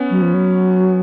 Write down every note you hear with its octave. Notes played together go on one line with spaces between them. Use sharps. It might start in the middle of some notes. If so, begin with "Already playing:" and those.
Already playing: B3 C#4
F#3
F3
F#3